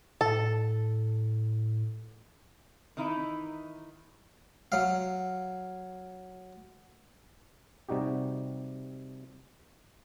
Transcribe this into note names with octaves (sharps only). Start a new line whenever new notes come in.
A2 A4
D#3 E3 D#4 E4
F#3 F5
C3 G3 D#4 F#4 G4